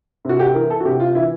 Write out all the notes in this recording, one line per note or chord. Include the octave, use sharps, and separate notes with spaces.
C3 F#4
G4
E3 A#4
A4
F#4
C3 G4
F4
E3 E4